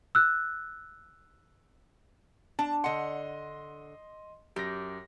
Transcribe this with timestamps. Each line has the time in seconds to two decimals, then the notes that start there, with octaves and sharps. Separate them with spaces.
0.15 E6 F#6
2.59 D4 A5
2.84 D3 D#5 F#5 C6
4.56 F#2 G4 A#6